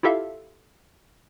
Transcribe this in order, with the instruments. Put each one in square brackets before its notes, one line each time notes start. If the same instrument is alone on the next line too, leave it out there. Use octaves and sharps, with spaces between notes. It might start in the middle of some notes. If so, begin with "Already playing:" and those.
[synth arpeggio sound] E4 F4 G4 A4 E5 F5